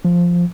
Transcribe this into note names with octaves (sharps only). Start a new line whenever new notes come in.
F3